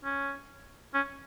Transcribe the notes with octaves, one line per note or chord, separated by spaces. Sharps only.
C#4
C#4